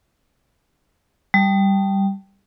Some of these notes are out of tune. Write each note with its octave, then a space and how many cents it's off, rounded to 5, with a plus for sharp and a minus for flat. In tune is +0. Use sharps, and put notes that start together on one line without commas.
G3 +0 A5 +0